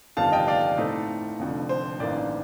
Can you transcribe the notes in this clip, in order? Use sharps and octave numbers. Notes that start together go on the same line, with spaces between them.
G1 F2 C3 D#3 G3 F5 A5
D#5 G5
D5 F5
A2 A3 C4 D#4
F1 F2 D3
C5
A1 G2 D#3 A#3 D5